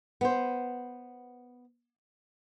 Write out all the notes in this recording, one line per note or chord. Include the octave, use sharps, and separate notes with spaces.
B3 C5